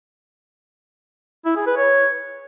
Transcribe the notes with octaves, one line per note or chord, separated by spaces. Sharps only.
E4
G#4
B4
C#5